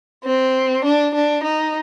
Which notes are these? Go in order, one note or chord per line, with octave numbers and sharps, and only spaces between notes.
C4
D4
D4
D#4